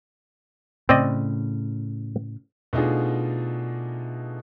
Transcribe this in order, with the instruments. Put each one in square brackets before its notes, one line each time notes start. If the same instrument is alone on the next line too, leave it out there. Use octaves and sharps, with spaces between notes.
[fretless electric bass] A2 C#3 [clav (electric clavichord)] C4 D5 D#5
[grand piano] B2 A3 D4 D#4 F4 G#4